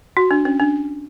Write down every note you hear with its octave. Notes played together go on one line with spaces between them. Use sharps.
F#4
D4
C#4
D4